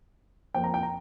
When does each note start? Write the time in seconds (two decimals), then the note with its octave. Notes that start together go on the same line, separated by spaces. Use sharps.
0.55 F2 F3 A#3 G5
0.64 A#5
0.74 G5
0.83 A#5